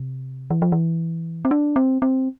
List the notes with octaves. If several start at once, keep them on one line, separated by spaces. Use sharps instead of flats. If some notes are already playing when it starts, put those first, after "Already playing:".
Already playing: C3
E3
F3
E3
C4
D4
C4
C4